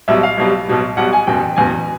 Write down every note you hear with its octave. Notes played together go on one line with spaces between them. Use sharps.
B1 B2 G3 E5
F5
B1 B2 G3
B1 B2 G3
B1 B2 G3 F#5
G#5
F#1 E2 B2 G5
F#1 E2 B2 G#5